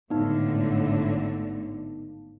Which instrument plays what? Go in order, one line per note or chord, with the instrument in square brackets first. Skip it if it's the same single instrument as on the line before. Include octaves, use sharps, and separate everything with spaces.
[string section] G#1 A2 D3 [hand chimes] B3 D#4